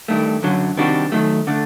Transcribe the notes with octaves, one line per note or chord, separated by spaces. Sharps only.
G2 D#3 A3
F#2 D3 F#3
C3 D#3 G3 D4 F#4
D#3 F#3 A3
D3 A3 D4